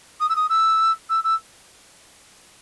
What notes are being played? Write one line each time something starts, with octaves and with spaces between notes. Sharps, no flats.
D#6
E6
D#6
E6
E6
E6